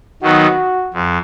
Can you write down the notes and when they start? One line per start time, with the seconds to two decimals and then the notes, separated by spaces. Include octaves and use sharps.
0.22 D#3 F#3 B3 D#4 F#4
0.94 F2